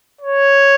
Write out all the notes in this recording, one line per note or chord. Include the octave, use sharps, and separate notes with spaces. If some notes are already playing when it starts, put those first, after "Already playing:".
C#5